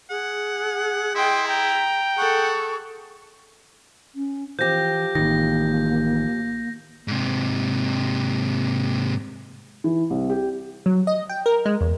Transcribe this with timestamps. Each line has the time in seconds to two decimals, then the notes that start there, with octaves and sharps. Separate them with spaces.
0.10 G#4 F#5
1.15 E4 D#5 G5 C6
1.48 G5 A#5
2.18 G#4 A4 F#5 C#6
4.15 C#4
4.59 E3 F3 G4 G6 A#6
5.15 A1 D#3 A#3 A#6
7.08 G#2 C3
9.84 E3
10.10 C2
10.30 G4
10.86 F#3
11.07 D#5
11.29 G5
11.46 A#4
11.65 G#3
11.81 E2